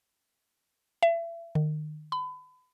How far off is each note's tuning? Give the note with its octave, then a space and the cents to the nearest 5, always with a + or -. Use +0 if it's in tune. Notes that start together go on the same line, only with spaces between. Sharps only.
E5 +35
D#3 -30
B5 +35